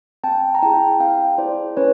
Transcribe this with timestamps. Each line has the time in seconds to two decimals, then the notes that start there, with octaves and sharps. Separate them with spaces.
0.24 C4 G5 A5
0.55 A#5
0.62 E4 G#4 G5 A5
1.00 C4 F5 G5
1.38 E4 G#4 C5 D5
1.77 C#4 B4 C#5